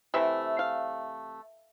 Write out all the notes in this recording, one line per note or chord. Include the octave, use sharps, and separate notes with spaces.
C3 E3 A3 E5
F5